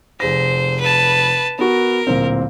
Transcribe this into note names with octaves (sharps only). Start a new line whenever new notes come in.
F1 G#4 C5 A#6
B4 A5
B3 F#4 A#4
D1 A#2 C4